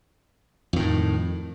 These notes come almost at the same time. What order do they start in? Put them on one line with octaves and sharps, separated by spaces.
F2 D#3 A2